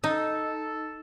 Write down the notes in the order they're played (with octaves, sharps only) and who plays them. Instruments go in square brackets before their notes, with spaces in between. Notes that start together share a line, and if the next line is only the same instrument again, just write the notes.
[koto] D#4 [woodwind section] A4